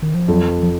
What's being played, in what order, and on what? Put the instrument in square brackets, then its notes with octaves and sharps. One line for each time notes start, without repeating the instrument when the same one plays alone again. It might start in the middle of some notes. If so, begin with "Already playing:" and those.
[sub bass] D#3
F3
[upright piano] F2 [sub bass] F#3
[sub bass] F3
F3